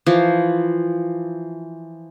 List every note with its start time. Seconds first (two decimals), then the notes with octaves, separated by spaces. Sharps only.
0.06 E3 F3